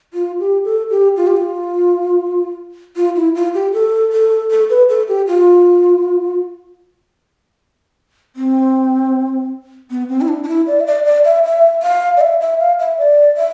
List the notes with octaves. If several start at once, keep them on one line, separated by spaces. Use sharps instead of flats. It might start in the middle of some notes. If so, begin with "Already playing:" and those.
F4
G4
A4
G4
F4
G4
F4
F4
E4
F4
G4
A4
A4
A4
B4
A4
G4
F4
C4
B3
C4
E4
D4
D4
E4
D5
E5
D5
D5
E5
E5
F5
D5
E5
E5
F5
E5
D5
E5